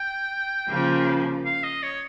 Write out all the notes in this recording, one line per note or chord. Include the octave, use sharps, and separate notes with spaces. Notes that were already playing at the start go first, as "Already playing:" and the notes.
Already playing: G5
C#3 F3 A#3
F5
D#5
C#5